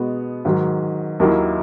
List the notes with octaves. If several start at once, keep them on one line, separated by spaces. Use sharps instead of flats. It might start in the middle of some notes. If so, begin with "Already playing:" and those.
Already playing: B2 G#3 B3 F#4
G#2 D#3 F#3
D#2 D#3 F#3 A#3 E4